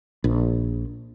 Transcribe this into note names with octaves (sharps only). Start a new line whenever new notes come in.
A#1